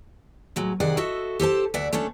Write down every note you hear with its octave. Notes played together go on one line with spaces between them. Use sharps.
A2 F#3 G#3
C3 D#3 G#4 D5 D#5 F#5
F#4 A4 D#5 E5
G4 A4 C5 A5
D2 D5 E5 F#5
A3 C#4 D4 A4